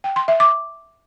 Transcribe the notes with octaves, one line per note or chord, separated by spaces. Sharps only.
G5
C6
E5
D6